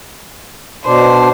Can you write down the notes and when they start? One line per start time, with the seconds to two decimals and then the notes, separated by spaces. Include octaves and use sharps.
0.86 B2 D4 C5